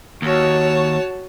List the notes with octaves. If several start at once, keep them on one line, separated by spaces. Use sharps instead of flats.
D#2 F#4 C#5 A5